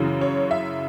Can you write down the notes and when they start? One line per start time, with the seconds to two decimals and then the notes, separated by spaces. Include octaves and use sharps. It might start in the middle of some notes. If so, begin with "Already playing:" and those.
Already playing: F#2 C#3 E3
0.21 C#5
0.51 E5